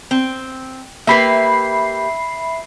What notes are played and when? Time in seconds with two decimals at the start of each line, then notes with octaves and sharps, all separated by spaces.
0.11 C4
1.07 A#3 G4 B4 E5 B5 C7